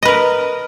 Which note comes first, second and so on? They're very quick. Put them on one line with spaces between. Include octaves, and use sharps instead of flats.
D#5 B4 A#4